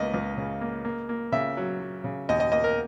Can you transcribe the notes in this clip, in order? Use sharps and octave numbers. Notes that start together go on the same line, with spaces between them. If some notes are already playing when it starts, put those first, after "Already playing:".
Already playing: C#2 A#3 B4 D#5
C#2
C#3
A#3
A#3
A#3
C#3 E5
F#3
F#3
C#3
D#2 D#5
D#5
A#3 D#5
A#4